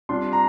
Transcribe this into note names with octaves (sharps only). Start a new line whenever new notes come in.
C3 G3 D4 F4 C6
A#5